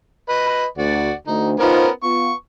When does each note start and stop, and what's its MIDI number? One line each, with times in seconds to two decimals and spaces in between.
0.29 0.65 71
0.29 0.65 75
0.29 0.65 83
0.78 1.10 38
0.78 1.13 66
0.78 1.13 74
1.27 1.57 38
1.27 1.50 63
1.60 1.89 59
1.60 1.89 61
1.60 1.88 63
1.60 1.88 65
1.60 1.89 70
1.60 1.88 72
2.03 2.32 59
2.03 2.32 65
2.03 2.33 85